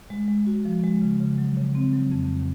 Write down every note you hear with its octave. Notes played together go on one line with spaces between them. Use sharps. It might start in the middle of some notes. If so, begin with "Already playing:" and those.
G#3
G#3
F#4
F3
G#3
C#3
C#3
F#3
C#3
C4
F#3
F2